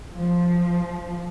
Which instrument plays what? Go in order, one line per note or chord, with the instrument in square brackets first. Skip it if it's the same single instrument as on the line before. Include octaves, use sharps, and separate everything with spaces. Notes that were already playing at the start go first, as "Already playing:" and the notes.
[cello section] F3